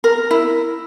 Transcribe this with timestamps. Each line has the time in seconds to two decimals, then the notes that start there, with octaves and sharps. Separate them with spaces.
0.04 A#4
0.31 E4